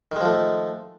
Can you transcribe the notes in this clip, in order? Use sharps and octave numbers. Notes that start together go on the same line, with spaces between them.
D#3 F3 G#3 A3